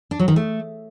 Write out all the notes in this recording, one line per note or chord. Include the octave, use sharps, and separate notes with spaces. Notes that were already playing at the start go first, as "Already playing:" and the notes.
D4
F#3
D#3
A3